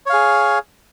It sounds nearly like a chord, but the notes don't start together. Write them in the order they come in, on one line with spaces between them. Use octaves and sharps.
C#5 F5 G#4